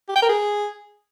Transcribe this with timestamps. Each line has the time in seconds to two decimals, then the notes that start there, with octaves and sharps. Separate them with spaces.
0.09 G4
0.16 G5
0.22 A#4
0.29 G#4